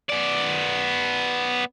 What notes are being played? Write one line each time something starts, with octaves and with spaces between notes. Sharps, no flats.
B3 D5